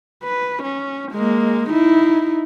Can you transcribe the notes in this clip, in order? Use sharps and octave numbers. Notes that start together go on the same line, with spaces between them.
B4
C#4
G#3 A#3
D#4 E4